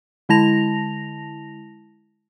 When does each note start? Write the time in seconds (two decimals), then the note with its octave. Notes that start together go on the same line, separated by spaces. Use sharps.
0.29 D3 G#3 E4 A5 A#6 F7